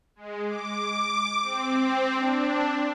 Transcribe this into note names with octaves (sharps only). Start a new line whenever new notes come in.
G#3
D6
C4
D4